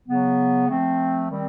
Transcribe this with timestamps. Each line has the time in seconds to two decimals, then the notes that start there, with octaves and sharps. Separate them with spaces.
0.06 C#3 F#3 B3
0.68 F3 A3 C4
1.29 D#3 G3 C4